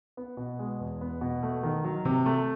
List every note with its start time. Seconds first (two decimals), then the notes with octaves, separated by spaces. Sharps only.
0.17 B3
0.37 B2
0.59 G#3
0.80 E2
1.01 B3
1.21 B2
1.43 A3
1.63 D#3
1.84 F#3
2.05 C3
2.26 A3